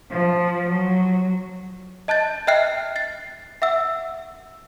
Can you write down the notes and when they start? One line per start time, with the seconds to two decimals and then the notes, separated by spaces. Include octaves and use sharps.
0.11 F3
0.69 F#3
2.08 D#5 A5 F#6 G6 A6
2.47 D#5 E5 G5 F6 F#6 C7
2.96 A6 C7
3.62 E5 F#5 E6